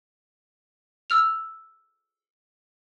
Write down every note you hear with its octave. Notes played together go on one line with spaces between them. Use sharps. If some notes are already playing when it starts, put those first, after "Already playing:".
E6 F6 F7